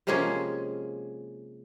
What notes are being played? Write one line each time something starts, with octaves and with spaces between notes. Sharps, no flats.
C3 F3 G#3 A#3 C#4 G#4